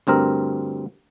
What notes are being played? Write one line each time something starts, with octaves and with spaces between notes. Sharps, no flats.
D2 G2 C4 A#4